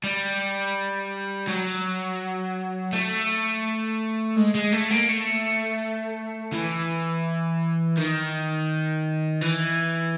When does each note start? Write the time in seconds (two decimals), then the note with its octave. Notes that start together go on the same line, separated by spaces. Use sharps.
0.04 G3
1.47 F#3
2.92 A3
4.36 G#3
4.55 G#3
4.72 A3
4.90 A#3
5.08 A3
6.53 E3
7.97 D#3
9.41 E3